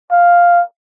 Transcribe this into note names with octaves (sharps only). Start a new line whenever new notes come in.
F5